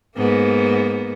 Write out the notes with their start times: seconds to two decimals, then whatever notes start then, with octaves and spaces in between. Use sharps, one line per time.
0.17 G#2 A#3 B3